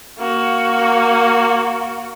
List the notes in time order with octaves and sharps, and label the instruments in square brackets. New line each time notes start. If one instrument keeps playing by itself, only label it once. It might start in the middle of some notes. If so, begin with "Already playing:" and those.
[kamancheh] A#3 F#4